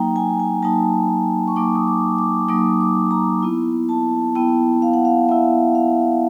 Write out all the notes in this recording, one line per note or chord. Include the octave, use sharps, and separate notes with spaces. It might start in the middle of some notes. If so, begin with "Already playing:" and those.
Already playing: F#3 A#3 D#4 G5 A#5
G#5
G#5
F#3 A#3 D#4 A5
C#6
F#3 A#3 D#4 D6
D#6
D6
D6
F#3 A#3 D#4 D#6
D6
A#5
B3 E4
A5
B3 E4 G5
F5
F#5
F5
B3 E4 E5
F5